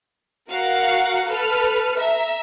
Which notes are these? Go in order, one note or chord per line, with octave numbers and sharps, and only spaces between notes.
F#4 A#4 F5 F#5
A4 B4 F6
E5 A#5